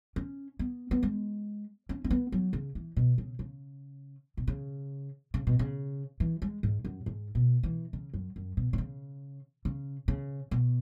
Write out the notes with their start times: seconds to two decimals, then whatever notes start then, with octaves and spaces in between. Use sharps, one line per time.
0.16 C#4
0.59 B3
0.91 B3
1.03 G#3
1.89 C#4
2.04 C#4
2.11 B3
2.32 F#3
2.53 C#3
2.75 E3
2.97 B2
3.18 C#3
3.39 C#3
4.37 B2
4.47 C#3
5.34 C#3
5.47 B2
5.59 C#3
6.20 E3
6.42 G#3
6.63 G#2
6.85 F#2
7.06 G#2
7.35 B2
7.63 E3
7.93 C#3
8.14 F#2
8.36 F#2
8.57 B2
8.73 B2
8.78 C#3
9.65 C#3
10.08 C#3
10.51 B2